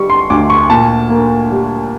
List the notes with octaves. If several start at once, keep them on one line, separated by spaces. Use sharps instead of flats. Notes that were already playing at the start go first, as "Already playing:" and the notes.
Already playing: D3 G3 C#6
C6
D2 D6
C#6
A#2 A5
A#3
G3